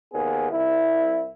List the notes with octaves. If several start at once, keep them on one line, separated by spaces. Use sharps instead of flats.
D#2 B3 G#4
C2 E4